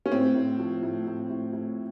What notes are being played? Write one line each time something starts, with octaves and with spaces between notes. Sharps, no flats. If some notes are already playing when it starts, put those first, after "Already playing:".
C#4
A2 C4
A2
F3
A2
A2
A2
A2